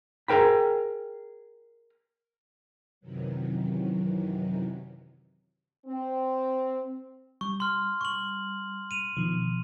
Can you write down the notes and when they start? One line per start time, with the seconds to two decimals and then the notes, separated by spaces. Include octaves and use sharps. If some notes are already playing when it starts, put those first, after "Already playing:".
0.28 G#4 A#4 G5 B5
3.01 F#2 C3 D#3 E3 F#3
5.87 C4
7.41 G3 C#6
7.60 C6 F6
8.01 C#6 F#7
8.91 D#7 F7
9.17 B2 D#3 F3